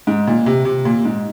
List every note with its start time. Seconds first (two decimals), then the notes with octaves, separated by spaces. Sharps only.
0.07 G#2
0.27 A#2
0.46 C3
0.65 C3
0.85 A#2
1.05 G#2